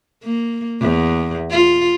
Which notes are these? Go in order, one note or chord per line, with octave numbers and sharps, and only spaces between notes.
A#3
E2
F4